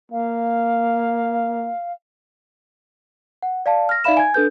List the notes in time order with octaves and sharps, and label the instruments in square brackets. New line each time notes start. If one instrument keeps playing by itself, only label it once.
[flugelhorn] A#3 [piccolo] F5
[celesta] F#5
D5 F5 A5
F6 A#6
D#4 D5 E5 F5 B5 E7
G#5 G#6
D4 A4 B4 G6